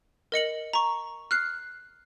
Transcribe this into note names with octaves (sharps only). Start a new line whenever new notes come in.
A#4 D#5 C#7 F#7
A#5 C#6
F6 F#6 C7